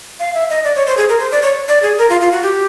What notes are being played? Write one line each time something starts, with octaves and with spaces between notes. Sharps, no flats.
F5
E5
D#5
D5
C#5
C5
G#4
A#4
C5
D5
C#5
D5
G#4
A#4
F4
F4
F#4
G4